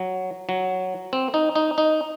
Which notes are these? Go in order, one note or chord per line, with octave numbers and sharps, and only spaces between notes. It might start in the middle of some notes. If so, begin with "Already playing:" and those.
Already playing: F#3
F#3
C4
D#4
D#4
D#4